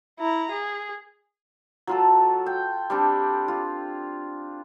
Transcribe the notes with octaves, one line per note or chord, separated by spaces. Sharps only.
E4 A#5
G#4
F#3 F4 A4
G5
G3 C4 D4
F4